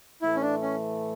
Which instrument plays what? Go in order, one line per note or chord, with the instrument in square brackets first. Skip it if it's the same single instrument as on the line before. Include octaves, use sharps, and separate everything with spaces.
[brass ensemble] A2 E3 A3 [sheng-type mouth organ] E4
[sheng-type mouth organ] C#4
D4
C#4